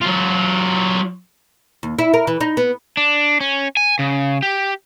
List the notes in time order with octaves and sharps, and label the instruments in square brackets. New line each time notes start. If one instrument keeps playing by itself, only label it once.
[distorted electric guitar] F#3 F4
[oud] D#2
E4
A#4
E3
D#4
B3
[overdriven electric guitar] D4
C#4
G#5
C#3
G4